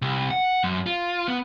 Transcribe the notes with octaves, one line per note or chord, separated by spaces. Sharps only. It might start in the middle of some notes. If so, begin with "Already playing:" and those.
C2
F#5
F#2
F4
B3